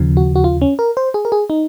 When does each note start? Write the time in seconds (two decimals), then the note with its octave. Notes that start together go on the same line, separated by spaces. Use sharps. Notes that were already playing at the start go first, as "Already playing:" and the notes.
Already playing: D#2 C#3 F3
0.17 F#4
0.36 F#4
0.44 F4
0.62 C#4
0.79 A#4
0.97 C5
1.14 G#4
1.25 A#4
1.32 G#4
1.50 D#4